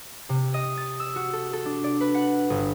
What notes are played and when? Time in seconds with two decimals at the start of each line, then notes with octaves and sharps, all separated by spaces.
0.29 C3
0.54 D#5
0.77 A6
1.00 E6
1.16 F#4
1.33 A4
1.53 A4
1.65 D4
1.84 D5
2.01 B4
2.14 F#5
2.50 G1